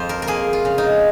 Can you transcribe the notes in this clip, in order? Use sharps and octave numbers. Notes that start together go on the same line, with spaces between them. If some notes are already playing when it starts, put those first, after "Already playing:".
Already playing: F2 F3 C5
A#4
A#4
A#3 G#4
F4
C#3
D#4